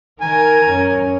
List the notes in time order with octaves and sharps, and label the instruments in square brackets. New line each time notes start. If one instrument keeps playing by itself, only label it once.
[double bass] D#3 [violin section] A#4 [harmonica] G#5
[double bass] F#2 C#4